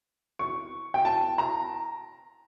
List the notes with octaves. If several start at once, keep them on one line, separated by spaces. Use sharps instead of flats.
C#6
G5
A5
A#5